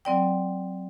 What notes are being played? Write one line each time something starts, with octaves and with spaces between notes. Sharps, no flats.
F#3 C4 D5 G5